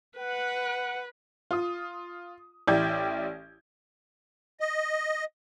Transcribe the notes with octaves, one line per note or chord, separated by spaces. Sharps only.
B4 F#5
F4 D#6
A1 E4 G4 D5 G6 G#6
D#5